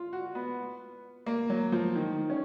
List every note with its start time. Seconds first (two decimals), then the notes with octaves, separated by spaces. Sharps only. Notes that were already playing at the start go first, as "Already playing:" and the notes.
Already playing: F4
0.13 F#4
0.35 B3
1.26 A#3
1.50 F#3
1.72 F3
1.95 D#3
2.30 C#4